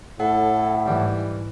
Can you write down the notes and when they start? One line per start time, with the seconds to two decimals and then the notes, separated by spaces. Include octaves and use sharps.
0.20 A2 A4 F#5
0.86 G#2 E3 G3